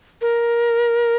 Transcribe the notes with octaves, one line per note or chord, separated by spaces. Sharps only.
A#4